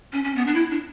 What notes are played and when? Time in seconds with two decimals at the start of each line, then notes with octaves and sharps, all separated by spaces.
0.13 C#4
0.24 C#4
0.36 B3
0.47 D4
0.55 E4
0.71 D4